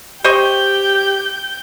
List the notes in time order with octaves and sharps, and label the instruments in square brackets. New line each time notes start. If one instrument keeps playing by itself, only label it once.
[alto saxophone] G4 [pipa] C5 D#5 C#6 [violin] G5 G6